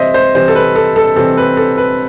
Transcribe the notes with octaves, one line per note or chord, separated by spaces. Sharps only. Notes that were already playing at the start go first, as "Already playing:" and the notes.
Already playing: C3 E3 G3 C4 C5 D#5 E5
C5
C3 E3 G3 C4 C5
A4
B4
A4
A4
C3 E3 G3 C4 A4
B4
A4
B4